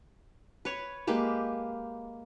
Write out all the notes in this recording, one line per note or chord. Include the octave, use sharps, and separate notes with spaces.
B4 C#5
G#3 A#3 G4 B4